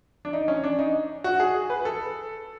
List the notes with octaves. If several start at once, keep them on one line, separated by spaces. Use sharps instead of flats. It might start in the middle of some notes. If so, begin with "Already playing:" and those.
D4
D#4
C#4
D4
D#4
F#4
G#4
B4
A4